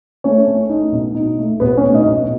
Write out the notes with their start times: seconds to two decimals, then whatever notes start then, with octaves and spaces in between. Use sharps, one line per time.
0.24 A3 C#4 C#5
0.48 A3
0.70 D#4
0.92 B2
1.15 D#4
1.38 A3
1.60 B2 B3 B4
1.77 C#4 C#5
1.84 A3
1.95 D#4 D#5
2.06 B2